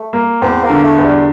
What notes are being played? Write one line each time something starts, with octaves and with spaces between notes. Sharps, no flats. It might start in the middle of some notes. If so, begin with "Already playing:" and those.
Already playing: A3
A#3
E2 C4
A#3
D3
A3
E2
G3